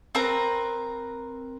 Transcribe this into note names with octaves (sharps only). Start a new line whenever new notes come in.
C4 A#4 B4 A#5